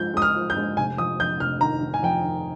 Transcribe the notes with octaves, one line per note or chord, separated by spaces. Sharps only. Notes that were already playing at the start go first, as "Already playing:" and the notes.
Already playing: G#2 F3 G#3 G6
G#3 D#6
F6
F3
G6
G#3
F1 G#5
F2 D#6
F2 G6
F1 F6
D#3 A#5
D#3
G#5
F2 G5
D#3